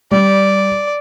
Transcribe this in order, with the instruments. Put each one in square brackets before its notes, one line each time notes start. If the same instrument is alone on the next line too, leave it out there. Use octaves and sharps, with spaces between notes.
[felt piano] G3 [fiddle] D5